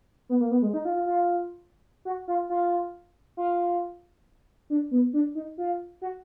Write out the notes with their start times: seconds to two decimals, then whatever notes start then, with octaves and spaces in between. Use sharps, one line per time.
0.29 B3
0.40 A#3
0.51 B3
0.62 G#3
0.74 D#4
0.85 F4
0.95 F4
1.06 F4
2.05 F#4
2.28 F4
2.50 F4
3.37 F4
4.70 D4
4.91 B3
5.13 D4
5.35 D#4
5.58 F4
6.02 F#4